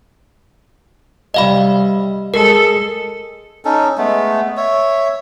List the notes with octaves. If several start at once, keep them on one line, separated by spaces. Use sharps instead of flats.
C3 G3 D#5 F5 B5
G#3 A4 A#4
C#4 D#4 A4
G#3 A3 B3
C#5 E5